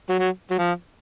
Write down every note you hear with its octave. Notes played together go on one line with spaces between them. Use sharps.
F#3
F#3
F#3
F3